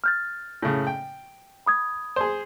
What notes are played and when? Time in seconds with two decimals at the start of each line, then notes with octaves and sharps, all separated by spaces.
0.04 F6 G6 A6
0.62 A2 C#3
0.87 G5
1.66 B5 D#6 G#6
2.16 G#4 C5